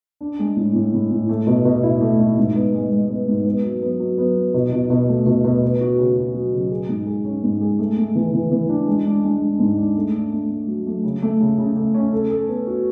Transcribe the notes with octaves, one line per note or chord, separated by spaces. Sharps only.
D4
G#3
A2
A2
A2
A2
A3
B2
B2
E4
A3
E4
G#2
B3
G#3
G#3
B3
G#2
B3
F#3
B3
F#3
B3
F#3
B2
B2
B2
A3
B2
B2
B3
F#4
C#3
F#4
F#3
C#3
G#4
G#2
G#4
C#4
G#2
G#4
A3
A3
E3
E3
E3
D4
G#3
D4
G#3
D4
G#2
D4
A3
D4
A3
A3
F#3
A3
C#3
A3
C#3
C#3
A3
C#4
A4
A4
B3
F#4